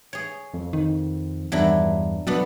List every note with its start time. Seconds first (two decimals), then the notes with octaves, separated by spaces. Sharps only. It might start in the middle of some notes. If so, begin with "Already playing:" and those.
0.13 G#4 C#5
0.54 F2
0.73 D#3
1.52 E2 G2 F#3 D4 E4
2.27 B2 F#3 B3 D4 A4